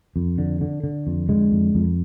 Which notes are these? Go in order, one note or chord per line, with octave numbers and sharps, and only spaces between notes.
F2
D3
D3
D3
F2
D3 G#3
F2
F2